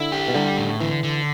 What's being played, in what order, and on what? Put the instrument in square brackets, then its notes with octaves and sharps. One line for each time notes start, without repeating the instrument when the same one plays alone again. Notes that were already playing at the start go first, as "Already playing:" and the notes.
Already playing: [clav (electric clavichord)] D3 [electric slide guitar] E4
[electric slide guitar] G4
[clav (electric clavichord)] B2
[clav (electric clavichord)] D3 [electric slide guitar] G3
[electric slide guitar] A2
[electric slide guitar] D3 [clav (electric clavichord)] E3
[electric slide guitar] D3